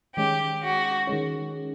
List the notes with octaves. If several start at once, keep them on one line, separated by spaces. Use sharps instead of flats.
D#3 G#3 C#4 G4
F#4
D#3 G#3 C#4